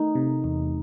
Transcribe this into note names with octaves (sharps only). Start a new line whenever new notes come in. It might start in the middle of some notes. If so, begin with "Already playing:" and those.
Already playing: A3 D#4
C3
E2